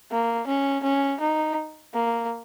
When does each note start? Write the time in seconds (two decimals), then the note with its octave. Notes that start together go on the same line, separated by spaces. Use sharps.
0.11 A#3
0.47 C#4
0.83 C#4
1.20 D#4
1.94 A#3